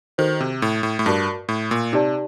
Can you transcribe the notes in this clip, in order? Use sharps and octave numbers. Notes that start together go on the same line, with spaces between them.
D#3 F#4 A4 C5
C3
A2
A2
A2
G2 F#4 A#4 D5 A5 D6
A2
A#2
C3 D#4 G4 D5 A5